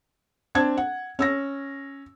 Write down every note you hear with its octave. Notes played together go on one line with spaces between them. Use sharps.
C4 D4 A5 G#6
F#5
C#4 E6 A#6